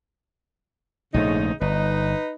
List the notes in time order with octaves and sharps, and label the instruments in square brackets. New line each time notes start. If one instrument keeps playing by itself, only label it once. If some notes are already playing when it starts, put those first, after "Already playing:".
[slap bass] A#1 G#2 A3 [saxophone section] C#3 D#4
[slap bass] G1 [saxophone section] D#4 B4